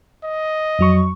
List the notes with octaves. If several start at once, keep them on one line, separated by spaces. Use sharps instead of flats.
D#5
F2 F#3 C#6